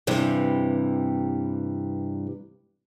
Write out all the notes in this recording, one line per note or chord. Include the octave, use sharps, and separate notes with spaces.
G2 C3 E3 G3